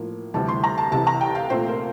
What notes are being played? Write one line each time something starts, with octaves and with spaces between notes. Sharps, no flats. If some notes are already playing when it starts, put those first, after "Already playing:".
Already playing: A2 F3 A#3
D2 C3 E3 G3 A5
C6
A#5
A5
C2 C3 E3 A5
A#5
G5
F5
A#2 A3 C4 C5
A#4